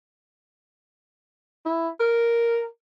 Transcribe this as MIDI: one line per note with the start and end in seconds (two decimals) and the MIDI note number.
1.66 1.89 64
2.00 2.65 70